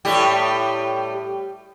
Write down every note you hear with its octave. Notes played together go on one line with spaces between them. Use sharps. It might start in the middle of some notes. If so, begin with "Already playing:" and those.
A2 G3 G4